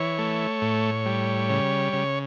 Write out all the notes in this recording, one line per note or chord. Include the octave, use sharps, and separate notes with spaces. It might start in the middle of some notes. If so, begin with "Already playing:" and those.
Already playing: E3 C#5
A3
A2
G3
C#3
C#3